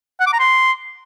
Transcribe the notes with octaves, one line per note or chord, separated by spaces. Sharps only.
F#5
D6
A#5
C6